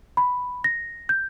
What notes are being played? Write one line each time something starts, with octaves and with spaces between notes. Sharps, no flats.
B5
A#6
G6